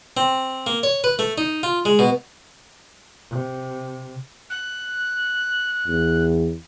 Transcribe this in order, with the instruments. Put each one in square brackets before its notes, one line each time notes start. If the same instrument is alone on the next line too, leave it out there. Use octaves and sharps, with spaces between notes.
[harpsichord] C4
A#3
C#5
B4
A3
D#4
F4
G#3
B2
[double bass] C3
[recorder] F#6
[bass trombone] E2